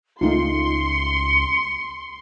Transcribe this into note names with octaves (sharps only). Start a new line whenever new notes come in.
C#2 A3 D#4 F4 C6 C#7